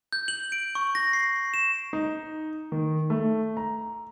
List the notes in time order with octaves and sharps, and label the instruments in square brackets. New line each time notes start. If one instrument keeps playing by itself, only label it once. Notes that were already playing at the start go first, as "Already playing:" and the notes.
[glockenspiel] G6
F#7
D7
C#6
A#6
C7
E7
[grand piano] D#4
D#3
A3
A#5